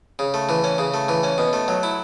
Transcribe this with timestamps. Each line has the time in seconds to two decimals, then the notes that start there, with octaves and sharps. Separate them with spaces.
0.19 C#3
0.34 A3
0.49 E3
0.64 C#4
0.78 C#3
0.94 A3
1.08 E3
1.23 C#4
1.38 B2
1.53 A3
1.68 F#3
1.83 E4